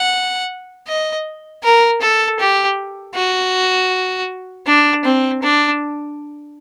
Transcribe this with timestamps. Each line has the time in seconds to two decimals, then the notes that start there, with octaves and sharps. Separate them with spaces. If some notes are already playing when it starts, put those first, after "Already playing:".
Already playing: F#5
0.88 D#5
1.63 A#4
2.01 A4
2.39 G4
3.15 F#4
4.67 D4
5.04 C4
5.42 D4